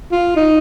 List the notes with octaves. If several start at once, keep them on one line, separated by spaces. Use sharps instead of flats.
F4
D#4